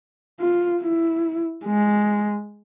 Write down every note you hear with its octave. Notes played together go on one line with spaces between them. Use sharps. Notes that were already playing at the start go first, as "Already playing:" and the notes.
F4
E4
G#3